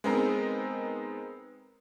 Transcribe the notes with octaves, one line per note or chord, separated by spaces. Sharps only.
G#3 B3 C4 D#4 A#4